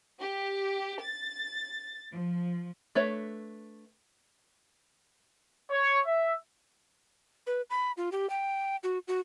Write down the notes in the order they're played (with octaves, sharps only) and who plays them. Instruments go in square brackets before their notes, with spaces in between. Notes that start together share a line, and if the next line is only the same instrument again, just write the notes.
[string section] G4
A6
F3
[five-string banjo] A3 D4 B4 C#5 E5
[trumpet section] C#5
E5
[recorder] B4
B5
F4
G4
G5
F#4
F#4